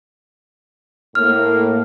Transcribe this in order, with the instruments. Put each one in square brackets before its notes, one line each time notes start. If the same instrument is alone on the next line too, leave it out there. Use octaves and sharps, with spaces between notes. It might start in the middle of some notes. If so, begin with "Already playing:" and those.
[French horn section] A2 A#3 [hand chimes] F6